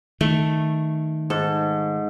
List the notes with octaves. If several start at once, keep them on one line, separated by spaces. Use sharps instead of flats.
D#3 A3
G#2 A4